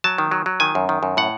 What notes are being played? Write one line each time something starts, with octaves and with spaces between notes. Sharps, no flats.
F#3 A5
D#3
F#3
F#3
D#3 G#5
F#2
D#3
F#2
A2 F#5